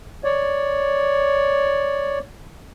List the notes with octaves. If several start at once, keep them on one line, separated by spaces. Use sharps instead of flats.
C#5 D5